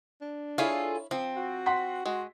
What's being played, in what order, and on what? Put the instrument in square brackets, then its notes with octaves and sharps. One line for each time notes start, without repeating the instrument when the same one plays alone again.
[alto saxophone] D4
[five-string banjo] E4 C#5 F5 [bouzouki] F4 G#4 A4
[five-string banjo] F3 [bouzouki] C4
[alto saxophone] F#4
[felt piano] F#5 C6 B6
[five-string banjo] G#3 [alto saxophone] F#4